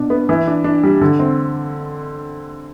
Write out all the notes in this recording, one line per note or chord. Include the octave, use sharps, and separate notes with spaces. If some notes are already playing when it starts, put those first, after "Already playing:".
Already playing: B2 D4
B3
E3
D4
D4
G3
D3
C4